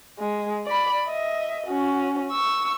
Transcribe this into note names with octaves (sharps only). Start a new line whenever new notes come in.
G#3
D5 B5
D#5 E5
C#4 F#4
C#6 E6